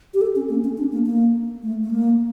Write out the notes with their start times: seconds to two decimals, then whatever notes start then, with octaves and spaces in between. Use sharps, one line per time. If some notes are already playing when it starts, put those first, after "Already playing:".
0.14 G4
0.21 A4
0.36 C#4
0.50 A#3
0.64 C#4
0.78 D4
0.92 A#3
1.06 A#3
1.63 A3
1.83 A3
1.91 A#3